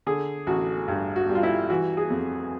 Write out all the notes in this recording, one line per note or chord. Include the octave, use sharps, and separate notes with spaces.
D3 G#4
A1 F#4
G2
F#4
G3
F4
E4
E3 F#4
G#4
F2